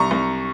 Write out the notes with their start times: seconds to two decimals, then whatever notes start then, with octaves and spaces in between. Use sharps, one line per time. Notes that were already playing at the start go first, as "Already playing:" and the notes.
Already playing: C2 A#5 C#6
0.11 C2